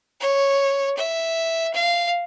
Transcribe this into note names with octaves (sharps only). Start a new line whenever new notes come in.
C#5
E5
F5